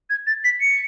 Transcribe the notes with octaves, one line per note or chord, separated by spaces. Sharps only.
G#6
A6
B6
C#7